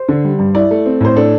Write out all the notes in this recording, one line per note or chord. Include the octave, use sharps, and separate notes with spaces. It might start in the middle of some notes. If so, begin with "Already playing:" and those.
Already playing: C5
D3
G3
G2
E4 D5
A3
C4
A2 C5
D4 A4